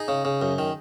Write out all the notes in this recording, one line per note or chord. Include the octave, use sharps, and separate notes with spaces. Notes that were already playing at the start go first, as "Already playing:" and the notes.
Already playing: D#4 G#4
C#3
C#3
F#2
D#3